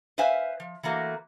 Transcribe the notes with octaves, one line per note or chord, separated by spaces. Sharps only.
B4 C5 E5 F5 G#5
F3
E3 A3 A#3 F#4